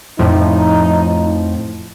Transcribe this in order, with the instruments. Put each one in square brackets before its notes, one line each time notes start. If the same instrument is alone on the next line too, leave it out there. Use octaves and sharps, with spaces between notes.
[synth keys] F2 A2 F3 [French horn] D#4